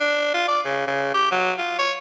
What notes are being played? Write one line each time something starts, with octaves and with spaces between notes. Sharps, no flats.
D4
F4
D5
C#3
C#3
G4
F#3
F4
C#5